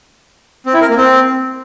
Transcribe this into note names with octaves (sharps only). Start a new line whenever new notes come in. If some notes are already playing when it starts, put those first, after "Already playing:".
C4
E4
A#4
A#3
C4